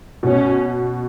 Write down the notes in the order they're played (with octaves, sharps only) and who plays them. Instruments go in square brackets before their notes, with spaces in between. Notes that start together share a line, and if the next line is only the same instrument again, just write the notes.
[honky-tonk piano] B2 [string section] C#4